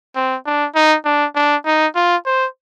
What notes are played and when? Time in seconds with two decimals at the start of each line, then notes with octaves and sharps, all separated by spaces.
0.16 C4
0.46 D4
0.75 D#4
1.05 D4
1.35 D4
1.66 D#4
1.95 F4
2.26 C5